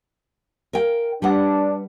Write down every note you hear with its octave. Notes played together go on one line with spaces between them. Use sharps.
A#4 F5 G5
G3 D4 B4 F#5